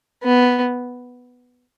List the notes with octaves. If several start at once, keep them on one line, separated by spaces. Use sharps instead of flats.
B3